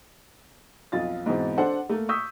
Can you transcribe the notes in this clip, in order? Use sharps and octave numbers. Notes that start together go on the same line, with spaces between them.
B1 F2 F4 A6
G#2 B2 E3 C4
D4 A4 C5 F#5
A3 A#3
C#6 D#6 E6 G6 B6